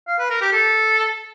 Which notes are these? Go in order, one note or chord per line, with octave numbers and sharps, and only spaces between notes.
F5
B4
A#4
G4
A4